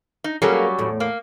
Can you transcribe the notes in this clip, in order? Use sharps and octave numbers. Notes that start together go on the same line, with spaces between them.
D#4
F#3 G3 A#3 C#4 G#4 A4
E2 A2
A#3